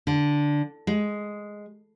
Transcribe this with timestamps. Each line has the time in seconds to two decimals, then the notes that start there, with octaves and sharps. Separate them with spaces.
0.07 D3
0.87 G#3